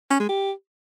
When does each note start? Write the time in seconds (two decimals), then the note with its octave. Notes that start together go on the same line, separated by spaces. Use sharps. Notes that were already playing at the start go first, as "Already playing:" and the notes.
0.11 C#4
0.20 G#3
0.29 G4